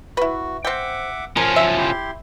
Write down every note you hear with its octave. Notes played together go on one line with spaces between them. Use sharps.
E4 F#4 B4
C4 E5 F#5 G5 D6
F3 C#4 A#4 F5 G#5
E5
E4 G4 C6